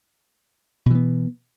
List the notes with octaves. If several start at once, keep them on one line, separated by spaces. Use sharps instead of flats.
B2 E3 B3